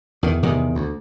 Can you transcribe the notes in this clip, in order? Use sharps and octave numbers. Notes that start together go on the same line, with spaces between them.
E2 D#3
E2 C3 D#3
D2